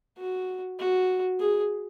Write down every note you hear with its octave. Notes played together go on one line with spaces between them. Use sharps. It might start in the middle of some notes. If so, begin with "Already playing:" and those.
F#4
F#4
G#4